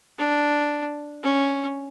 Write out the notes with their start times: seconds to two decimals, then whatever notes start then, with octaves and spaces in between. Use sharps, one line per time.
0.19 D4
1.24 C#4